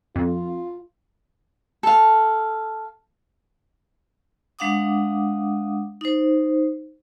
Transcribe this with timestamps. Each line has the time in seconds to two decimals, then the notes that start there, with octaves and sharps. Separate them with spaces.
0.16 F2 F4
1.83 A4 F5
4.59 G#3 D4 F5 F#5 D6 D#6
6.01 D#4 C5